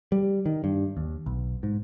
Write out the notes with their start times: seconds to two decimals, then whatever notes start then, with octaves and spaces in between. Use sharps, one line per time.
0.12 G3
0.46 D#3
0.64 G2
0.97 D#2
1.26 B1
1.63 G#2